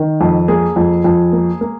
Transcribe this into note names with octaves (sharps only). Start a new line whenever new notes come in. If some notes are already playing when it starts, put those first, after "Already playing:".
Already playing: D#3
F2
A#3 G#4
F2
F2
A#3
A#3